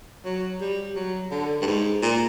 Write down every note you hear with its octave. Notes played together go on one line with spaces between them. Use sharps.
F#3
G3
F#3
D3
G2
G#2
A#2